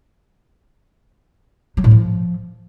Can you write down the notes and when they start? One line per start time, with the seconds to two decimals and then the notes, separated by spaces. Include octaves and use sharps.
1.77 F#3
1.84 A2
1.91 F3